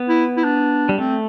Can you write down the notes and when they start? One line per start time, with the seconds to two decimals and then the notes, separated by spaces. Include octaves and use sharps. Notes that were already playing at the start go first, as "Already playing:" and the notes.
Already playing: B3
0.09 E4
0.37 E4
0.44 D4
0.89 G3
0.98 A3 C4